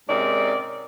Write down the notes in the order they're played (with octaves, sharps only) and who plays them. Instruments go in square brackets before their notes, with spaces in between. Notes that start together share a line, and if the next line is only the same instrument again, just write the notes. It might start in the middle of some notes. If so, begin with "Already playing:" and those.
[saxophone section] G#2 C3 C#4 D#4 A#4 D5